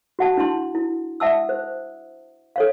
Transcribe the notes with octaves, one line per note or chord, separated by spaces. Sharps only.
F#4 F#5 A5
D4 E4 A5 C6
E4
E5 F#5 A5 D#6 E6
C5
A4 C#5 F5